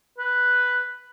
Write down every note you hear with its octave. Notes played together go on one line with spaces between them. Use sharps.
B4